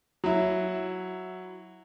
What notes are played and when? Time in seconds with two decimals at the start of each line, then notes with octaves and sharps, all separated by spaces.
0.24 F#3 E4